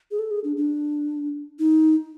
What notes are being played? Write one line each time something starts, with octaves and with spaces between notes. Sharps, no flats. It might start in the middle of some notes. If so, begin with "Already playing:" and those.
G#4
A4
G#4
D4
D4
D#4